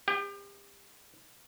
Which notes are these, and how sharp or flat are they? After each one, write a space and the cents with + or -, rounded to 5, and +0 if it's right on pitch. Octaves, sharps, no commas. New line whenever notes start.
C4 +0 G4 +40 G5 +0